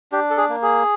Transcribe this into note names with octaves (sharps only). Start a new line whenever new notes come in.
D4 G4
A4
G#4
A#3
G#4